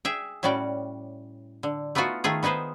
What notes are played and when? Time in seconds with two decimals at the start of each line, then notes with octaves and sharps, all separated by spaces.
0.05 G#4 E5 G5
0.43 A2 G3 C#4 F#4 D5 G5
1.63 D3
1.95 A3 B3 D#4 F4 F#4
2.24 D#3 A3 F4 G#4
2.43 B3 D#4 G#4 B4 C5